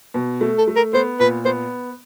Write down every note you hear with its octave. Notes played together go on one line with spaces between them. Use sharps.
B2
A3
A4
A3
A#4
B3 C5
A#2 B4
B3 C5